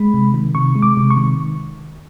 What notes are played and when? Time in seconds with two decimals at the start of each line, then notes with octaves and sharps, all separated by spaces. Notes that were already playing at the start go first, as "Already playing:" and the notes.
Already playing: G#3 B5
0.14 C3
0.34 D#3
0.55 C3 C#6
0.75 G#3
0.82 D6
0.97 C3
1.11 C#6
1.17 D#3